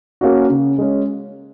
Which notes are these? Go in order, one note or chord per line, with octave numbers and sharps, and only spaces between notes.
A#3 C#4 F#4
C#3
G#3 C#4